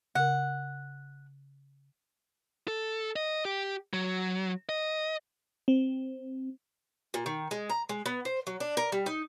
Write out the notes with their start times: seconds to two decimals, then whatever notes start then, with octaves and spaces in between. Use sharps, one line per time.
0.15 C#3 A#4 F#5
2.68 A4
3.16 D#5
3.45 G4
3.93 F#3
4.69 D#5
5.68 C4
7.14 A#2
7.26 D#3
7.51 G#3
7.70 A#5
7.89 G#3
8.06 B3
8.25 C5
8.47 F#3
8.60 D4
8.77 A#4
8.92 G3
9.06 D#4